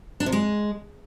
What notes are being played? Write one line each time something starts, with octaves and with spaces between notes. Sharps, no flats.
D4
C3
G#3